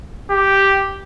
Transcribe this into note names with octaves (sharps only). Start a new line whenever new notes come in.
G4